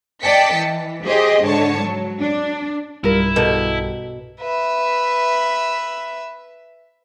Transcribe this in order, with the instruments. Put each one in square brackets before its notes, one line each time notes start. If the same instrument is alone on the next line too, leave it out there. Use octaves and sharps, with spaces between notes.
[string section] D5 D#5 G5 A5 B6 C#7
E3
G4 G#4 C5 D#5
G#2 D3 C#5 A5 C#7
F#3
D4
[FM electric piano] B1 G2 G3 [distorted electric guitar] E4 [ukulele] F4 A#4
[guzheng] B2 [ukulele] G4 A4 A#4
[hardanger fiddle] B4 E5